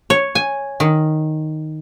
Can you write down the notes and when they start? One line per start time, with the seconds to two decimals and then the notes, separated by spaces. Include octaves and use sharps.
0.10 C#5
0.35 G#5
0.80 D#3